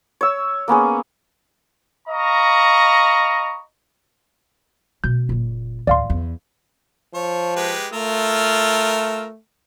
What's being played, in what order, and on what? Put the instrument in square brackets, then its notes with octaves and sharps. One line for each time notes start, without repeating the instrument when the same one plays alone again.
[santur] C#5 E6
A#3 B3 C#4 G#4
[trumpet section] D#5 F5 A#5 B5 C#6
[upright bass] B2 A3 [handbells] G6
[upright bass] F#1 A#2
[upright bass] A1 D2 [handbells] D5 F5 C6
[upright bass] E2
[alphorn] F3 [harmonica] C#5
[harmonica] G#3 G4 B4
[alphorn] A3 [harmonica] F4 A#4 E6